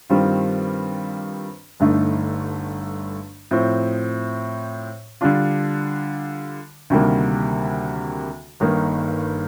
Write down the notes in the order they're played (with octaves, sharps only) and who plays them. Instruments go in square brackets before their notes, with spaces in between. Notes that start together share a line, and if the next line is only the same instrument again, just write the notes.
[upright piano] G2 D#3 G3 C4 F4
G1 G2 D3 A3 D#4
A2 F3 C4
D3 G3 D4 F4
D2 C3 D#3 G3 A#3
G1 G2 D#3 A#3 D#4